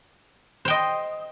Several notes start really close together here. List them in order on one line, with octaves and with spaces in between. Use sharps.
C5 G5 D#5